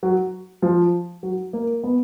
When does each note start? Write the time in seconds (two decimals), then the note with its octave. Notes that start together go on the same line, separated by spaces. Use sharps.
0.03 F#3
0.62 F3
1.23 F#3
1.53 A#3
1.83 B3